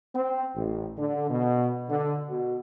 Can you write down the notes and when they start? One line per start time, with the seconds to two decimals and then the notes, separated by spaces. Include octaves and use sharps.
0.15 C4
0.56 A1
0.98 D3
1.30 B2
1.90 D3
2.29 B2